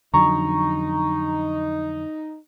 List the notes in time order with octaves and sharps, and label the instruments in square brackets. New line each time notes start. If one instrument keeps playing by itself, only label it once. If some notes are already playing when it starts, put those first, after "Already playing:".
[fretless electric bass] F2 D3 F#3 [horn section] D#4 [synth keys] A#5 C#6